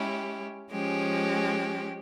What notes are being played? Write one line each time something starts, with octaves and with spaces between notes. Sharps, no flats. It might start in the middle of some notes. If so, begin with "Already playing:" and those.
Already playing: G#3 C#4 E4 G4
F3 G#3 C#4 G4